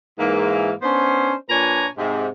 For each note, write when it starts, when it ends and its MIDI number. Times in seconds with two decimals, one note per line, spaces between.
0.19 0.72 44
0.19 0.72 52
0.19 0.72 58
0.82 1.34 59
0.82 1.34 61
0.82 1.34 62
0.82 1.34 72
1.50 1.87 46
1.50 1.87 62
1.50 1.87 71
1.50 1.87 73
1.50 1.87 80
1.50 1.87 82
1.98 2.28 44
1.98 2.28 48